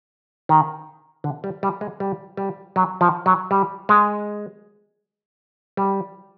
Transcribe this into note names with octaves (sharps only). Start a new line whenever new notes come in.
D#3
D3
G3
G3
G#3
G3
G3
F#3
F3
F#3
G3
G#3
G3